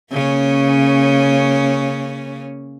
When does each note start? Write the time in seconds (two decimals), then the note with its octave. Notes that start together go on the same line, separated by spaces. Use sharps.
0.11 C#3 A#3 C#4